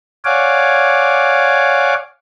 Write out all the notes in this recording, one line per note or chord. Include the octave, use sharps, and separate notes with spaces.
C#5 D5 F5 F#5 G#5 D6